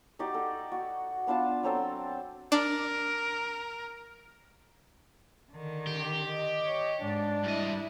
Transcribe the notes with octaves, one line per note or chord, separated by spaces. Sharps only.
D#4 F#4 G4 D5
A4
F#4
B3 D4 F4 A5
F#3 C4 A4 A5
D4 A#4
D3 D#3
G4
D#5
C#5
G#2 D4
G2 E4 D#5